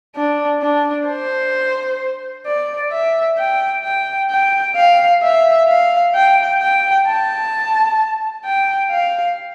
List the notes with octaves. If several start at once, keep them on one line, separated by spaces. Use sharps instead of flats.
D4
D4
C5
D5
E5
G5
G5
G5
F5
E5
F5
G5
G5
A5
G5
F5